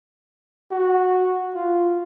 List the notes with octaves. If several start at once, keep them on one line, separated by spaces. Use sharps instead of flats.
F#4
F4